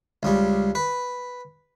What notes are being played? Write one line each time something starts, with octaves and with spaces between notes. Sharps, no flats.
C#2 C#3 G3
B4